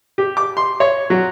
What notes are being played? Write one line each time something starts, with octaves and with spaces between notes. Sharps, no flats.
G4
D6
C6
C#5
F#3